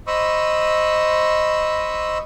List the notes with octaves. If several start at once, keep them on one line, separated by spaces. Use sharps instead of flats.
C5 D#5 B5 C#6 D#6 E6